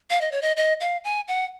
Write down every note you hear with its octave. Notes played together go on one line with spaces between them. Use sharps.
F5
D#5
C#5
D#5
D#5
F5
G#5
F#5